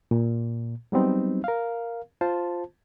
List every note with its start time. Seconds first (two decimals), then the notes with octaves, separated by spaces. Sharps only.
0.11 A#2
0.92 F#3 G3 B3 C4 D#4
1.44 A#4 F5
2.21 F4 C5 A5